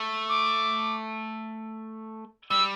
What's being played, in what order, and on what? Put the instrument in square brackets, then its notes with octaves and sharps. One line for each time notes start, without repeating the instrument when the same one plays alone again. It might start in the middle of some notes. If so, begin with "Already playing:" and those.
Already playing: [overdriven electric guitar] A3
[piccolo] D6
[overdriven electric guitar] G3 [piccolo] E6